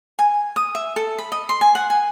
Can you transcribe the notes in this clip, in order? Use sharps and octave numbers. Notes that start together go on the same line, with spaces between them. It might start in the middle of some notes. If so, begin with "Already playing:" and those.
G#5
D#6
E5
A4
B5
D#5
C6
G#5
F#5
G#5